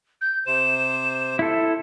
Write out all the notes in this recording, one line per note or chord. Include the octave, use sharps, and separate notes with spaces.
G6
C3 C5 E7
E4 A4